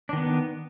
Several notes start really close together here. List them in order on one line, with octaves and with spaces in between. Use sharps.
D4 D#3 B3